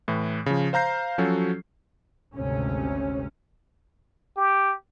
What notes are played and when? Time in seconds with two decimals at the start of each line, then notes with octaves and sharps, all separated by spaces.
0.08 A2 E3
0.46 C#3 F3
0.73 C5 F5 A#5 G6 C7
1.18 F3 F#3 C#4 F#4 A4
2.35 G#1 D2 C3 C#4
4.37 G4